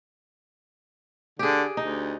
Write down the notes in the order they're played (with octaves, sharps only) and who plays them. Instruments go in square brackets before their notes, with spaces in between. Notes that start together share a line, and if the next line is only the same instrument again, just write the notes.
[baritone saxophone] D3 [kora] G4 G#4
[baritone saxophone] D2 [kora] D#4